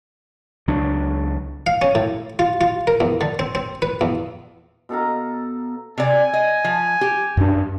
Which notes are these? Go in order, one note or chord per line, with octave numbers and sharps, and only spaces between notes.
C#2 F#3 D4
F5
C#4
A2
F4
F4
A#4
E2
D3
C4
C4
B4
E2
B2 A4 F5 A#5
C3 D5 G#5
D#5
F3
G4
F#2 D4